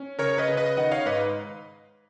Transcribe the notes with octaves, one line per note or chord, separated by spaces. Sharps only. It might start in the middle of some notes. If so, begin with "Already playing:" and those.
Already playing: C#4
C#3 A#4 C#5
B4 D#5
C#3
B4 D#5
D#3 D#5 F#5
C#5 F5
G#2 B4 D#5